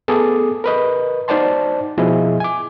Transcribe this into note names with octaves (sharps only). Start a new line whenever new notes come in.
B3 G#4 A4 D6 D#6
A#4 B4 D#5
D#4 C5 D5 F#5 A5 C6
B2 F3 E4 G#4 D#5
G#5 D6